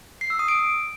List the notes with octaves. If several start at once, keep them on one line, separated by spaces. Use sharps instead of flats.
C7
E6
D#6
D7